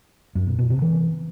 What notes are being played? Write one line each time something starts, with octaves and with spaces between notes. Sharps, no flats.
F#2
B2
B2
C3
E3